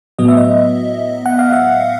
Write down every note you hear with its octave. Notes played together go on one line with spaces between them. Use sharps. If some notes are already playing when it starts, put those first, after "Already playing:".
A2 F#3 B3 D#5
E5
D#5
F#5
F5
E5